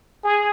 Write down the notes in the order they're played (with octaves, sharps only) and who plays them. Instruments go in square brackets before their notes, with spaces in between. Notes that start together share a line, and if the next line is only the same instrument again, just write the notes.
[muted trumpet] G#4